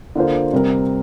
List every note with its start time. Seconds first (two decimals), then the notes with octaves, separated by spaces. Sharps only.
0.16 D3 A#3 F4 C5
0.52 C3 G3 C4 A#4